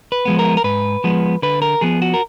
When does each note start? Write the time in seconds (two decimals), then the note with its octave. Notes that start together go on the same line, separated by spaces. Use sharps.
0.12 B4
0.25 F3 G#3 B3
0.39 A#4
0.57 A#4
0.64 G#2 B4
1.04 F3 G#3 B3
1.42 D3 B4
1.62 A#4
1.81 F3 B3 G#4
2.02 F#4
2.14 A#4